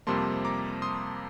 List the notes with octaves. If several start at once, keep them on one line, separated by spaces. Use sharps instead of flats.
F2 C3 G3 A#3 A5 C6
A#5 D6
C6 D#6